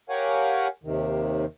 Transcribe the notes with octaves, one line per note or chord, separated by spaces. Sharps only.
G4 A#4 C#5 F5 F#5 G#5
D#2 C3 D#3